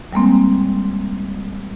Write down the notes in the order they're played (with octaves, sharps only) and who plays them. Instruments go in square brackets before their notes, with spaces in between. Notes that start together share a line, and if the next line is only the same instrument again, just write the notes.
[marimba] G3 G#3 A#3 C4